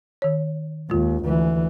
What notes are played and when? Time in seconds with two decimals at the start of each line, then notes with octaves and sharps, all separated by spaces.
0.22 D#3 C#5
0.90 D#2 G#3 F4
1.24 D2 E3